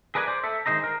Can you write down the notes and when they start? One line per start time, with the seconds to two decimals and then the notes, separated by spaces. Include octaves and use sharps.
0.15 G#4 A#4 B4 D5 F#5 G#5
0.27 C5 D5
0.44 A4 E5
0.66 D#3 G#3 C5 D#5 A#5
0.84 A#4